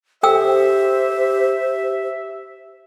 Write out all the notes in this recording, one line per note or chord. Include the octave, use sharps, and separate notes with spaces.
G4 A4 C5 E5 G5 E6